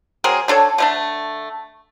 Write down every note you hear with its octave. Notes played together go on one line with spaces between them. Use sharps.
F#3 C4 G#4 A#4
D3 D4 A4 C#5
D3 A3 D4